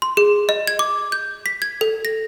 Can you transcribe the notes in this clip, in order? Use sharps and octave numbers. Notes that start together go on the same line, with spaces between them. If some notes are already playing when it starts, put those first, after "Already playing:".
C6
G#4
D#5
G#6
D6
G6
B6
G#6
A4
A#6